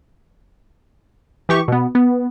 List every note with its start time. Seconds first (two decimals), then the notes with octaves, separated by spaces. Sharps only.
1.49 E3 G4 C#6
1.68 B2 B3
1.95 B3